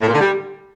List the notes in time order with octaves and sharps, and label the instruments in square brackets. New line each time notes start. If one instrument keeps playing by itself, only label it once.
[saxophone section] A2
A#2
D3
G3